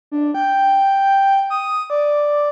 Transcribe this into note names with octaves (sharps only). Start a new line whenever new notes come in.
D4
G5
D#6
D5